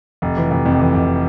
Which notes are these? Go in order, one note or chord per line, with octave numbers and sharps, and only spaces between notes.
F1
E3
F1
F2
E3
F1